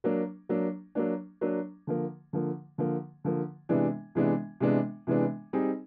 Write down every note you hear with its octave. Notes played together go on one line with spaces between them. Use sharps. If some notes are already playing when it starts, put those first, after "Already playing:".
F#3 A#3 D4
F#3 A#3 D4
F#3 A#3 D4
F#3 A#3 D4
D3 F3 A#3
D3 F3 A#3
D3 F3 A#3
D3 F3 A#3
C3 E3 G#3 B3 D4
C3 E3 G#3 B3 D4
C3 E3 G#3 B3 D4
C3 E3 G#3 B3 D4
G3 C4 D#4 G#4